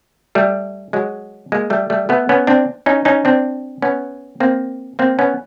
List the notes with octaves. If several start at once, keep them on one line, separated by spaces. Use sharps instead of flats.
G3 A3
F#3 G#3
G#3 A#3
G3 A3
G3 A3
A3 B3
B3 C#4
C4 D4
C#4 D#4
C#4 D#4
C4 D4
B3 C#4
A#3 C4
A#3 C4
B3 C#4